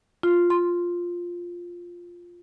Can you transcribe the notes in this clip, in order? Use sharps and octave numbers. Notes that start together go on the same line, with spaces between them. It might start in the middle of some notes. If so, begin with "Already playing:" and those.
F4
C6